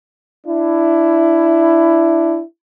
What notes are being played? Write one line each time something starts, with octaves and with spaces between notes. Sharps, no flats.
D4 E4